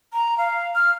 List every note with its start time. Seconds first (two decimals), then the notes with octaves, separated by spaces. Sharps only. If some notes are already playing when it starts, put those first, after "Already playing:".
0.13 A#5
0.38 F5
0.75 F6